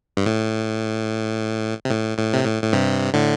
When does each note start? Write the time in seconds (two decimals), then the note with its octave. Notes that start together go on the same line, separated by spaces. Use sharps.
0.17 G2
0.26 A2
1.85 C3
1.90 A2
2.18 A2
2.34 C3
2.45 A2
2.63 A2
2.73 G2 C3
3.13 A2 D3